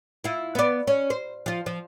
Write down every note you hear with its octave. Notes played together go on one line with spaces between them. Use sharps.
E4 F4
B3 D5
C#4
C5
F3 F4
F3